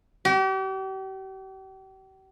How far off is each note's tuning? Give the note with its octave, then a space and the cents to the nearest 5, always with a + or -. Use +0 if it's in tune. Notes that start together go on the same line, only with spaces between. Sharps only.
G4 -40